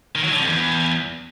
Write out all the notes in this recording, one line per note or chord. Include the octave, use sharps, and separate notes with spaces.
D#3
F#3
D3
F2
E2